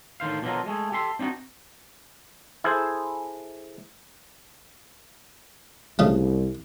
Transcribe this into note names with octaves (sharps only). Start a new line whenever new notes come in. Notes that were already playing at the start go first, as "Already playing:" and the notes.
A2 D3 D#3 C5 F5
B2 D3 F3 F#3 F4 A#4
G#3 A3 G#4
G4 A4 E5 C6
C4 D4 D#4 F4 F#4
E4 G#4 A4 C5
C2 C#3 F3 A3